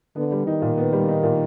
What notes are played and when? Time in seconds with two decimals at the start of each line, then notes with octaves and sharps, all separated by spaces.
0.16 D3 B3
0.32 G3
0.46 D#3 D#4
0.62 A#2
0.78 B3
0.93 G3
1.08 D#4
1.23 A#2